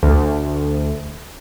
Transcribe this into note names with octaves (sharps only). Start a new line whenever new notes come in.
D2